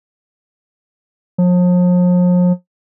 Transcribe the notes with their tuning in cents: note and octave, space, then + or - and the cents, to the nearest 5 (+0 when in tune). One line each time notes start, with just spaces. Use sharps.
F3 +40